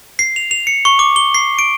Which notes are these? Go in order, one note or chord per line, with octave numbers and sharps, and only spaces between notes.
C7
F7
F7
C#7
C#6
D6
G7
C7
D7